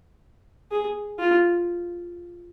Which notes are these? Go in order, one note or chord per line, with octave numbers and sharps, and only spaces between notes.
G#4
F4